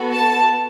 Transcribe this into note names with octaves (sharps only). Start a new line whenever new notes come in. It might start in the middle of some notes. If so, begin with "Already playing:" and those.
Already playing: B3 F#4 A4
A5